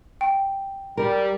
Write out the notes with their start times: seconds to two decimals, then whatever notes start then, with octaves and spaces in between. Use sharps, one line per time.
0.21 G5
0.97 G3 A#4